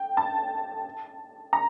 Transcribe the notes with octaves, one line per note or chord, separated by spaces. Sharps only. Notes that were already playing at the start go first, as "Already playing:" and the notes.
Already playing: G5
A5
A#5